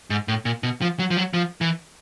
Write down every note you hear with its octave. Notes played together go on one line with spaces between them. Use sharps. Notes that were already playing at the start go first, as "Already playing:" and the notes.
G#2
A2
A#2
B2
F3
F#3
F3
F#3
F3
E3